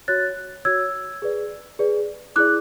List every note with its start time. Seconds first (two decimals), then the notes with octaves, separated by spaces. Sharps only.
0.08 F#4 C#5 F#6 A6
0.65 F#4 C#5 E6 G#6
1.22 G#4 B4 D5
1.79 G#4 B4 D5
2.36 E4 G#4 D5 D6 F#6